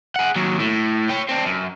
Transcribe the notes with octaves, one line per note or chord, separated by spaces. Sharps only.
G#4 F#5
D#2 F#3
A2
C#5 G5
C4 D4
F#2